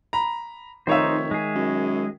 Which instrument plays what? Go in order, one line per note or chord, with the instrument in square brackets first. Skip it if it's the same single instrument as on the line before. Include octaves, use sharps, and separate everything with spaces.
[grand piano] A#5 B5
[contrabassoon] F1 [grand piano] D#3 C#5 E5 [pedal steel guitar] D#4 C5
[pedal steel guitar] G#3 G#4
[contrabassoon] F#2